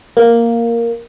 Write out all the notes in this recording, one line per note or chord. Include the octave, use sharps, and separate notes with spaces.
A#3